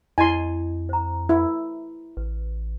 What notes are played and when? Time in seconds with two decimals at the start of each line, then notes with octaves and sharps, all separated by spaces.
0.18 F2 E4 D#5 G#5 C6
0.89 C5 A#5
1.29 E4
2.17 A1 B4